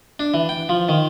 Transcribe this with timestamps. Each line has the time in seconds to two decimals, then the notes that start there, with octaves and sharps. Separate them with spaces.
0.20 D4
0.34 E3
0.49 G5
0.69 F3
0.89 D#3